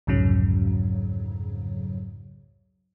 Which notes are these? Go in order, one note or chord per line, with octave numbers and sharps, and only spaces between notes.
C2 F2 G#2 C#3 F#3